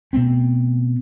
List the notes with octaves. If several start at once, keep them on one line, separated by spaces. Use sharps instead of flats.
B2 A3 B3 C4